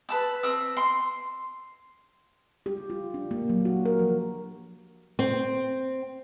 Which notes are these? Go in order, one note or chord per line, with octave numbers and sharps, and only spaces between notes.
B4 A5 E6
C4 E6
C6
G4
F4
D4
A#3
F#3
F#4
A#4
F3
C4